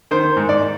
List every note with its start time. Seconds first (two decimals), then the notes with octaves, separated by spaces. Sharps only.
0.11 D#3 C5
0.37 G#2
0.49 D5